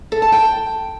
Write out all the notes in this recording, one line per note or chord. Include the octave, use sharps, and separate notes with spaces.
A4
A5
G5